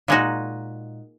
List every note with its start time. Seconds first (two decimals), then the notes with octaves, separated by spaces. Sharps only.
0.08 A#2 G#3 D#4 F#4